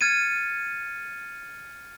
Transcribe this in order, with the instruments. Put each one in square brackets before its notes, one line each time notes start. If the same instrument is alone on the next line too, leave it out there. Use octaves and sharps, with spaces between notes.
[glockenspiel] F6 G#6 A6 C#7 D#7